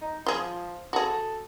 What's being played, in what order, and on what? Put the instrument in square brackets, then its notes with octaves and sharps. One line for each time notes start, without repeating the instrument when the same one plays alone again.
[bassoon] D#4
[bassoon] F3 [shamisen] F4 G#4
[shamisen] F#4 G#4 [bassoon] A4
[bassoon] A4